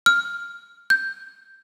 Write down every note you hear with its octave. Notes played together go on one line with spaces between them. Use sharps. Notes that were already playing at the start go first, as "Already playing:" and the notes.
F6
G6